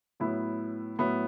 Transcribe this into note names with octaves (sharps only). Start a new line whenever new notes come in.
A2 F#3 B3 E4
A2 F#3 B3 E4